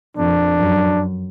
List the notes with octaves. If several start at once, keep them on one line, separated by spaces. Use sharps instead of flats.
F2 D4
F#2